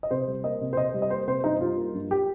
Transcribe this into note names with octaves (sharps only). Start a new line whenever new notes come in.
D#5
C3 C5
G3
A#3 D#5
C3
C5
C3 D#5
G3
D#5
A#3 C5
C3 C5
G2 D#4
G3 F4
A#3
G2
G4